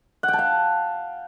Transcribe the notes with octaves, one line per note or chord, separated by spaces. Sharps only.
F#5
G5
A5
F5